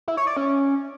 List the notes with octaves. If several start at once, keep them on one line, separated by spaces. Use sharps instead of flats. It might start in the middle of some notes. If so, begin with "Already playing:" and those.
E4
C#5
D5
C#4